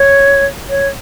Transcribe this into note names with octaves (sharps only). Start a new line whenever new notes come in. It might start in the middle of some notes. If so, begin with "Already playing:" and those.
Already playing: C#5
C#5